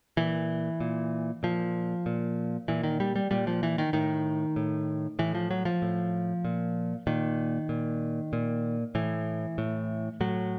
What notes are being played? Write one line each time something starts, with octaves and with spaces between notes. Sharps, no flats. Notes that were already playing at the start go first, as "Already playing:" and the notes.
A#2 E3
A#2
A#2 F3
A#2
A#2 E3
D#3
G3
G3
A#2 G3
F3
E3
D#3
A2 D#3
A2
A2 E3
F3
F#3
F3
A2
A#2
A#2 D#3
A#2
A#2
A2 E3
A2
A2 F#3